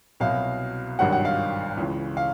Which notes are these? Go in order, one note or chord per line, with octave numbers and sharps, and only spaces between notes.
C2 B2 F#3 F5
G#1 G2 D#3 F#3 F#5
F#5
F5
C#2 C#3 E3
F5